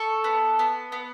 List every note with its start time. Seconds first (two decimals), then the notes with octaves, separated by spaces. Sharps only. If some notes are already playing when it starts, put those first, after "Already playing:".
Already playing: A4 C#6
0.24 B3
0.59 B3
0.92 B3